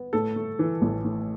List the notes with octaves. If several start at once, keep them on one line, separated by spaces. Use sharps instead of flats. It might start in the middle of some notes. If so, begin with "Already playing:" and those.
Already playing: B3
A2 A4
A3
E3
A1
A2